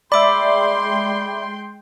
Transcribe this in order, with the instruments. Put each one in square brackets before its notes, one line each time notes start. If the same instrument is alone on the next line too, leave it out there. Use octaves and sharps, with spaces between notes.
[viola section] G#3 G5 C6 [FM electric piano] D5 E5 [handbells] B5 D6